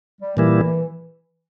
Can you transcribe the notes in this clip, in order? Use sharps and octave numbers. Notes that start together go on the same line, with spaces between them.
G3
A#2 E3 G3 A#3 E4